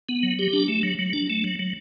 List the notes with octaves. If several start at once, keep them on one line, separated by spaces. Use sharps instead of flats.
B3
F#3
G4
D4
A3
F#3
F#3
D4
A3
F#3
F#3